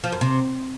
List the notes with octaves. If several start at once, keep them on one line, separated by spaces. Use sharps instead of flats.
F3
F#2
C3